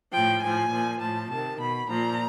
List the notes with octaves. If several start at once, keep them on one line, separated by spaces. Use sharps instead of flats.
A2 F3 G5
A2 F3 G#5
A#2 F3
A2 F3 A5
C3 D#3 A5
B2 B5
A#2 F3 A#5